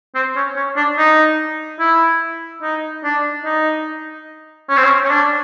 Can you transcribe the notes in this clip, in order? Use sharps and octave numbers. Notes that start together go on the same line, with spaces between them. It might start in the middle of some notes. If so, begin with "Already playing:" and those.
C4
C#4
C#4
D4
D#4
E4
D#4
D4
D#4
C#4
C4
C#4
C#4
D4